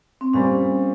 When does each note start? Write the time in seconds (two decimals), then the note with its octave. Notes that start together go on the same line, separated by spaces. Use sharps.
0.21 C4
0.33 A#2 G3 C4 C#4